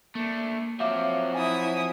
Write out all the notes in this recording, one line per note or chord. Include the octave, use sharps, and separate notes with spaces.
A3 A#3 D4
F3 F#3 C4 E5 F5 D6
E4 G#5 D#6